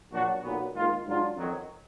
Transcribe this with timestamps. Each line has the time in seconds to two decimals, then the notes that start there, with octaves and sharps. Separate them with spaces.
0.11 A#1 A#2 F#3 D4 F#4
0.43 B1 A#2 F#3 B3
0.74 G#2 D#3 A#3 F4
1.06 G#2 F#3 D4 F4
1.37 F2 D#3 F#3